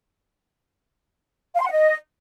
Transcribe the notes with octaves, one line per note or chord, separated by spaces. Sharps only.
F5
C6
F#5
D#5